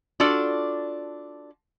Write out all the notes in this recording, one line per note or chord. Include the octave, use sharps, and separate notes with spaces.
D4 F4 F#4 A4 D5